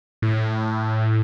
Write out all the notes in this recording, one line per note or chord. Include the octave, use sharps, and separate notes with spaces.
A2